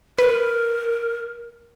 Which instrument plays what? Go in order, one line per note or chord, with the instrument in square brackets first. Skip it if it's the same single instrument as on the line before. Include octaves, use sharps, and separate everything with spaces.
[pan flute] A#4 [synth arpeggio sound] B4